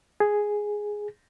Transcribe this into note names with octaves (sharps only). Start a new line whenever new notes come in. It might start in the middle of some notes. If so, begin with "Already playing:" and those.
G#4